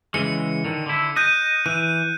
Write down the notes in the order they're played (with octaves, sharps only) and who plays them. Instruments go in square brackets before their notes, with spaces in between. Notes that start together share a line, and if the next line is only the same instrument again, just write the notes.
[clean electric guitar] C#3 E3 G#3 [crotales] C#7
[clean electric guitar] D3 D#3
D3 E4
[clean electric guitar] D#5 [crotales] F#6 G6 D#7
[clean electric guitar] E3 [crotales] F#6